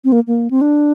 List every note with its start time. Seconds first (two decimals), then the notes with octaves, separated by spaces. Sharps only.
0.04 C4
0.12 A#3
0.27 A#3
0.51 C4
0.61 D4